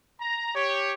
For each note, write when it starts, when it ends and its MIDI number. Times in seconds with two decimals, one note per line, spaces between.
0.20 0.53 82
0.55 0.93 67
0.55 0.93 73